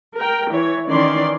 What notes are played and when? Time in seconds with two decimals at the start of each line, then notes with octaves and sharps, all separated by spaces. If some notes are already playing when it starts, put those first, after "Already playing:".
0.15 A#4 G5
0.51 E3 C#5
0.89 D#3 E3 C#4 D5 C6